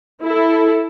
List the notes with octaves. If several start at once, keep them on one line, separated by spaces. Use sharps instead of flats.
E4 A4